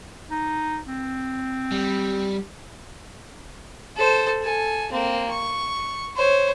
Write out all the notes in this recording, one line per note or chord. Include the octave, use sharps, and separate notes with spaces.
D#4
C4
G3
A4 C5
A4 G#5
A#3 C4
C#6
C5 C#5